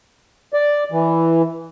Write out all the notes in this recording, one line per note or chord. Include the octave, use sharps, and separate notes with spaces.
D5
E3